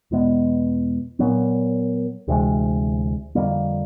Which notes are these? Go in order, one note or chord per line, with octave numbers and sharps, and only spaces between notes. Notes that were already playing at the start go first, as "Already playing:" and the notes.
E2 B2 G#3 B3
A#2 F#3 B3
D2 C3 E3 G#3
F2 D3 G3 A#3